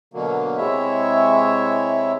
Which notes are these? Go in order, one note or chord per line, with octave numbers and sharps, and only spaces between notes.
B2 D3 F#3 A#3
C3 G#3 E4 C#5 E5